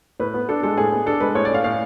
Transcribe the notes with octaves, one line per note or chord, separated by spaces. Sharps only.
A2 B4
B3
D4 A4
G#3 A4
A2 G#4
B3
D4 A4
G#3 B4
A2 C#5
D5
C#4 F5
A2 F5